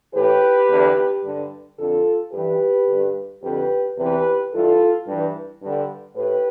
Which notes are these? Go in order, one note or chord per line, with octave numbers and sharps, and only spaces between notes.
A2 E3 G4 B4
E2 D3
G2 D3
F2 D3 F4 A4
G2 E3 G4 B4
G2 D3
F2 D3 G4 B4
E2 C3 E3 G4 B4
G2 E3 F4 A4
G2 E3
G2 D3
A2 G4 B4